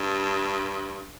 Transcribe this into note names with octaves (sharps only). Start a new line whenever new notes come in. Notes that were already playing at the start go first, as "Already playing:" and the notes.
Already playing: G2